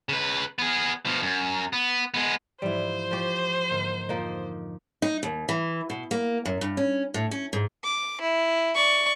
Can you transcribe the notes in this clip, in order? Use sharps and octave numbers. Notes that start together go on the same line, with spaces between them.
C#3 B4
B3 G#4
B2 F3
F#2
B3
G#3 B3
G#2 E3 F3 G3 E4 C5
F3 G4 C#5 C#6 G6
G#2 D3 A#3
F2 F3 A#3 D#4
D#4
D#2
E3
B2
A#3
F#2
G2
C#4
A2
C#4
G#2
D6
E4
D5 C#6